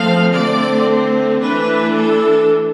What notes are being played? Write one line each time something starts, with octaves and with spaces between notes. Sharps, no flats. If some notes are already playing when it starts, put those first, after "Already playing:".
Already playing: F3 A3 C4 F5
D3 A3 C4 D5
E3 A3 D4 B4
A4